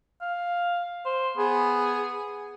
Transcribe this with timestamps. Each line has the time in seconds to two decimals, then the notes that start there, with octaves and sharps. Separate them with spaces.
0.21 F5
1.05 C5
1.37 B3 G#4